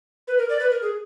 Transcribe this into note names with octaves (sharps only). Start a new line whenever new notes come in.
B4
A#4
D5
B4
A#4
G#4